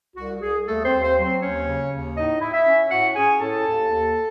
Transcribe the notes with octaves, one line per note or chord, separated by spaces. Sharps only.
C2 F#4
C2 G#4
D#2 A3 A4
C4 C5
D#2
C4 C5
F#3
C4 C5
D#2 C#4 C#5
C#3
D#2
A2 D#4 D#5
E4
E4 E5
C#4
A2 F#4 F#5
C#4 G#4 G#5
A2 A4 A5
D#2
D#2